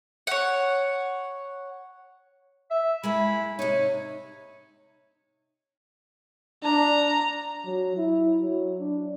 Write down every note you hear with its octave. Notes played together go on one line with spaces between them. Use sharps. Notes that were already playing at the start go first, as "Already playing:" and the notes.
C#5 F#5
E5
G#3 A#3 E4 B5
C3 D#4 C#5
D4 A#5
F#3
E4
F#3
D4